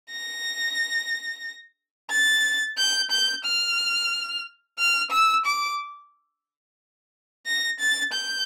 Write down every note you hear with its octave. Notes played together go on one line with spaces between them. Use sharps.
A#6
A6
G6
G6
F6
F6
E6
D6
A#6
A6
G6